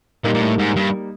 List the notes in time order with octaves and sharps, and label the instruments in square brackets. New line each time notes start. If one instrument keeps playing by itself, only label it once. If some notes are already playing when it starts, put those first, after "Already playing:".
[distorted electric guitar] A#2 [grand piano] G3 A#3 D#4
[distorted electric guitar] A#2
A2
G#2
G2